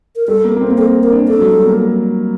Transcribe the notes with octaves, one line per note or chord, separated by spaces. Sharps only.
A#4
G3 A4
A#3
A#3
C4
A#3
C4 A4
A#4
D4
D4 A4
F#3
G3
A#3